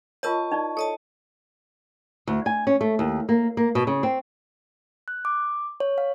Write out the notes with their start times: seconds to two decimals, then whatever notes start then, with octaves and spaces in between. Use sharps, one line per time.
0.23 F4 A#4 C#5 D#5 A5 C#6
0.52 D#4 E4 D5
0.77 A4 C#5 D#5 A5
2.27 D2
2.46 G#5
2.67 C#4
2.81 A3
2.99 D#2
3.29 A#3
3.57 A#3
3.75 B2
3.87 C#3
4.03 C4
5.08 F#6
5.25 D6
5.80 C#5
5.98 F5